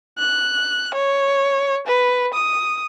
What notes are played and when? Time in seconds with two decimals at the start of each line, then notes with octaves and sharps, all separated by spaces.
0.19 F#6
0.94 C#5
1.87 B4
2.34 D#6